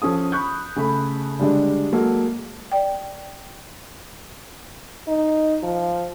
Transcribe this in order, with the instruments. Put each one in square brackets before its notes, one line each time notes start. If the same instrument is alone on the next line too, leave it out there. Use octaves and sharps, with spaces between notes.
[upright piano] F3 C#4 A4 D#6
B5 C#6 F#6 G6
C#3 A3 B5
D3 G3 G#3 D4
F#3 G#3 A#3 G#4 A4
[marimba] D5 G5
[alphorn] D#4
F3